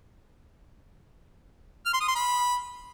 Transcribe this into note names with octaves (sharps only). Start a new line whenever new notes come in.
F6
C6
D#6
C6
B5